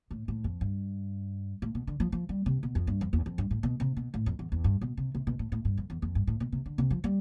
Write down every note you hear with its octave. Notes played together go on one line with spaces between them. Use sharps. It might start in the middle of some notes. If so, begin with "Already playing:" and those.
A2
A2
F2
G2
A2
B2
D3
F3
F3
G3
C3
B2
F2
G2
F2
E2
F2
G2
A2
B2
C3
B2
A2
F2
E2
E2
G2
B2
C3
C3
B2
A2
A2
G2
F2
E2
F2
G2
A2
B2
C3
D3
C3
F3
G3